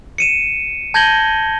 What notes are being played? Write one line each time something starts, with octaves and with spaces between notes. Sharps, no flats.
C#7 D#7 E7
A5 G6 G#6 A#6 F#7 G7